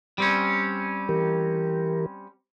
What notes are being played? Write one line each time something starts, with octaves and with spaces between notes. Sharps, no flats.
G3 C4 C#4
E3 G4 A#4